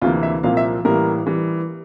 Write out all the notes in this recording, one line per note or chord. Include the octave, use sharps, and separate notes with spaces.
D2 C3 E3 A#3 F4
E5
C2 A#2 F3 A#3 F5
E5
A2 E3 G3 A#3 A#4
E3 G3